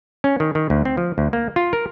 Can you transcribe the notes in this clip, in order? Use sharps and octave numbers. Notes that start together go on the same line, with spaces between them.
C#4
D#3
D#3
D2
C4
F3
D2
A#3
F4
A#4